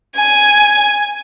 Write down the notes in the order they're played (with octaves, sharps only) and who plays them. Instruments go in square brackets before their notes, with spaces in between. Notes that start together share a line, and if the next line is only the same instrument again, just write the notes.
[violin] G#5